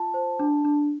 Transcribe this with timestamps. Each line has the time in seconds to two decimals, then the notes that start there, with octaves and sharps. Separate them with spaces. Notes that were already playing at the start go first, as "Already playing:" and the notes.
Already playing: F4 A5
0.14 C5
0.39 D4
0.65 D4